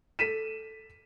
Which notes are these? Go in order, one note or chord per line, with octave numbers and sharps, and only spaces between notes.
A4 B6 D#7 E7